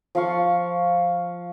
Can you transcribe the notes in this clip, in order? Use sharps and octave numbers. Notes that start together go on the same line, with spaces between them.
F3 F5 C#6